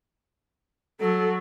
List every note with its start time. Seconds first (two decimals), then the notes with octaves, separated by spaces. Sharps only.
1.00 F#3 A4